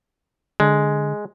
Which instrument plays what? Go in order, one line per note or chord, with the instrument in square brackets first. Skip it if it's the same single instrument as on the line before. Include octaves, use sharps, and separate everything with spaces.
[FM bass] D3 [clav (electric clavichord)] G#3